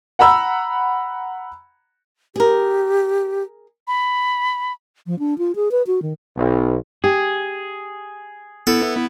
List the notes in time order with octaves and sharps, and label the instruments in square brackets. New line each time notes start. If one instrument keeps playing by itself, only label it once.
[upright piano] F#5 A#5 B5 E6
[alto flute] G4 [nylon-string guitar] G#4 A#4
[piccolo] B5
[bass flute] F3
D4
F4
G#4
B4
F#4
D#3
[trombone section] B1
[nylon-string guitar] G4 [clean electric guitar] G#4
[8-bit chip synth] B3 E4 [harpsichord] A4